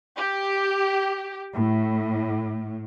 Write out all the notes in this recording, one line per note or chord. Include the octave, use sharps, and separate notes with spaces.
G4
A2